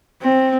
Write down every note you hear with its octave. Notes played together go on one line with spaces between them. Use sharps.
C4